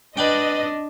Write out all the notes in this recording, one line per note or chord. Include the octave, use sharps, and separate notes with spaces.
D4 B4 D5 D#5 G5